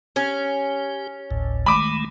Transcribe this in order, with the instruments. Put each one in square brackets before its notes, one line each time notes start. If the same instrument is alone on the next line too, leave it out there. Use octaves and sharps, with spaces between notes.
[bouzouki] C#4 [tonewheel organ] G4
[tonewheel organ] G#1 D2 A2
[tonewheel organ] D#3 G#3 A3 [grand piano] B5 D6